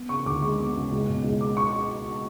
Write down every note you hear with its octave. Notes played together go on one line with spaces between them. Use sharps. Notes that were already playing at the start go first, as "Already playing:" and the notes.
Already playing: B3
C#3 C#6
D2 D6
G#3 C#6
B3
C#3
C#2
B2
C#2
G#3 D6
C#6